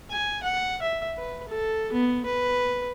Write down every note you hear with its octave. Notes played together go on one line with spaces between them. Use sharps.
G#5
F#5
E5
B4
A4
B3
B4